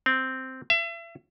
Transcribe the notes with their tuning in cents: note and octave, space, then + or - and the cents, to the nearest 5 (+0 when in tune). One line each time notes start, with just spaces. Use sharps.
C4 -5
E5 +35